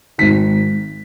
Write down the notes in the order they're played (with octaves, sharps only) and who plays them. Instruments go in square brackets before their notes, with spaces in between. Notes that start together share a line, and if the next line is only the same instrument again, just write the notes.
[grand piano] G#1 G#2 D#3 B6